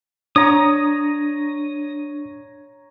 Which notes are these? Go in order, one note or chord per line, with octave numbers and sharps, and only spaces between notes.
D4 C#5 A#5 D#6